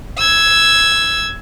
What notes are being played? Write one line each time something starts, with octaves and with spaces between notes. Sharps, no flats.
E6 G#6